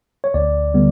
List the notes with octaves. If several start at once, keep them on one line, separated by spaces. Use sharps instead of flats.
C#5
D2 D5
D3 G3 B3